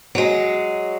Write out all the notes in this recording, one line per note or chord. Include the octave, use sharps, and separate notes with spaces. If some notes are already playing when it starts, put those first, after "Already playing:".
F#3 G#3